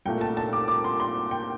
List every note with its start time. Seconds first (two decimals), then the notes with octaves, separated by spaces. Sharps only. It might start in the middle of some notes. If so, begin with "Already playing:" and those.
0.05 C2 A#2 A3 G5
0.21 A5
0.37 A5
0.53 D6
0.68 D6
0.84 C6
1.00 C6
1.31 G5